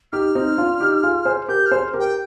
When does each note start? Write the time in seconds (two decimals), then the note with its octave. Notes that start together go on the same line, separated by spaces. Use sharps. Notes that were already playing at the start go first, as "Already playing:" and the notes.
0.12 D#4 G4 F6
0.35 C4 D#4
0.58 D4 F4
0.80 D#4 G4
1.03 F4 G#4
1.25 G#4 C5
1.48 G4 A#4 G6
1.66 F6
1.71 G#4 C5
1.94 G4 A#4
2.00 G5